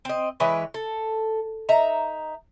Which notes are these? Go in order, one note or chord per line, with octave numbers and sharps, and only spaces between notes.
C4 D#5
E3 G#3 B4 C#5
A4
D#4 E5 A#5